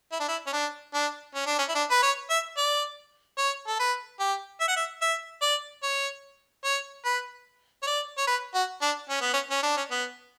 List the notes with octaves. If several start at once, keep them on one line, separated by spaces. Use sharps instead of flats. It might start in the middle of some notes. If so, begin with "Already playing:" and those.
E4
D4
E4
C#4
D4
D4
C#4
D4
C#4
E4
D4
B4
C#5
E5
D5
C#5
A4
B4
G4
E5
F#5
E5
E5
D5
C#5
C#5
B4
C#5
D5
C#5
B4
F#4
D4
C#4
B3
C#4
C#4
D4
C#4
B3